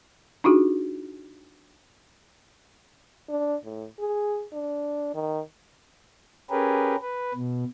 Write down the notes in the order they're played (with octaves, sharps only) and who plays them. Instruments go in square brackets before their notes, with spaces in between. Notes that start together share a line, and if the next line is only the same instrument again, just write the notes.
[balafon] D4 D#4 F4 F#4 G#4
[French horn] D4
A2
G#4
D4
D#3
[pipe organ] C#4 G4 G#4 A#4 B4
B4
B2